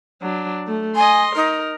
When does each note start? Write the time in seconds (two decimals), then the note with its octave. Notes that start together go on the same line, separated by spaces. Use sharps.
0.22 F#3 D4
0.67 A3
0.96 D#5 G#5 C6
1.36 D#4 A#4